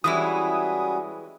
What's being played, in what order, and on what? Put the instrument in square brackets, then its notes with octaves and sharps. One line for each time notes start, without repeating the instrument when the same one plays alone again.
[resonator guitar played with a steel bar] E3 G#3 E4 [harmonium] G3 C#4 F#4 [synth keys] D#6